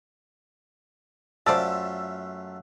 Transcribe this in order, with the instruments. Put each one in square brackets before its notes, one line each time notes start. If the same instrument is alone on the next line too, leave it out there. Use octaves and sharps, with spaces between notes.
[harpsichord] F#2 A3 F4 [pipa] C5 D5 A5 [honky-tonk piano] E6